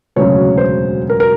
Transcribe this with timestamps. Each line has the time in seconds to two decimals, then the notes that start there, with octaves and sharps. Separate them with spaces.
0.16 E1 D2 C#3 F#3 C#5
0.58 C5
1.10 A#4
1.20 A#4